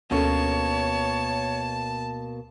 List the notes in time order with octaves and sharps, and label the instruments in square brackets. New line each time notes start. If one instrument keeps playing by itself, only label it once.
[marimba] D2 C#4 A4 [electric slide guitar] B2 A#3 [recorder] C#5 [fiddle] A5